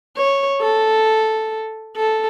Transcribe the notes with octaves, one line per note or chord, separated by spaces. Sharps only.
C#5
A4
A4